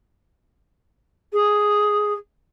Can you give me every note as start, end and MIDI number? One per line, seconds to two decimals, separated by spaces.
1.33 2.13 68